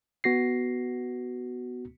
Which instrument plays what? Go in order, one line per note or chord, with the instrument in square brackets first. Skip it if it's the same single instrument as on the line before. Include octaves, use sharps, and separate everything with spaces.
[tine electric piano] B3 F#4 A#6 C7